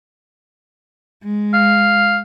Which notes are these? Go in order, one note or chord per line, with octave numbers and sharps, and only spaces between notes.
G#3
F5